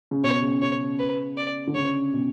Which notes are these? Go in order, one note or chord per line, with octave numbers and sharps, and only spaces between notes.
C#3
B2 C#5
C#3
C#3 C#5
B4
D5
D3
C#3 C#5
B2